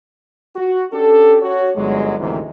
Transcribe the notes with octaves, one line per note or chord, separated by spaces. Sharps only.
F#4
C#4 D4 G4 A4
F#4 C#5
G1 F#2 F#3 G#3
D2 G#2 C3 D#3 E3